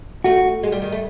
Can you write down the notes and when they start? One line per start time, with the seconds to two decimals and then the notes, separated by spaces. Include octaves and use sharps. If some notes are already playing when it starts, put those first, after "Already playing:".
0.24 A3 F#4
0.63 G#3
0.72 G3
0.82 D#3
0.92 A3